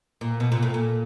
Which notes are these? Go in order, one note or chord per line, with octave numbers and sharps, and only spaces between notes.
A#2
B2
A#2
A2
A#2